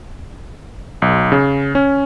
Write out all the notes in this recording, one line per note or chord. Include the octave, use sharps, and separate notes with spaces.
B1
C#3
C#4